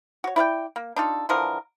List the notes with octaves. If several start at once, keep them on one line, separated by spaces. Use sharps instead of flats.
F#4 C#5
E4 D5 F5 G5
A#3
D4 D#4 F4 A4
D3 E3 F3 A#4